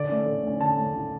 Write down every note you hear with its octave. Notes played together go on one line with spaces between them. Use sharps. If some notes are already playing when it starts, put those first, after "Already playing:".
Already playing: D3 D5
A3 C#4
D3
A3 C#4
D3 A5
A3 C#4
D3